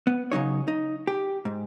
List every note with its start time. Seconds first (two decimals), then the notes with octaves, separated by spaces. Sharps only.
0.07 B3
0.32 C#3 F#3 D#4 C#5
0.68 D#4
1.07 G4
1.45 G#2